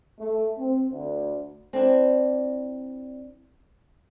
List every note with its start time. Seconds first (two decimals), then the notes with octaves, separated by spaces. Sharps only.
0.19 A3
0.58 C4
0.91 D2
1.73 C4 D4 E4